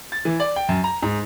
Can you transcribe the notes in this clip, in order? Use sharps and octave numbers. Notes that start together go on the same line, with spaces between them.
A6
E3
D5
G5
F#2
A#5
G#2